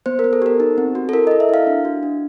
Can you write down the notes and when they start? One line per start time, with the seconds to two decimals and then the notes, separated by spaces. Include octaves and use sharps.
0.06 B3 C5
0.19 A#4
0.24 B3
0.33 A4
0.42 G4 A#4
0.60 D#4
0.78 C4
0.95 F#4
1.09 A4
1.13 E4 A#4
1.27 D#5
1.31 A4
1.40 E5
1.49 E4 F5
1.67 D4
1.85 F#4
2.03 D4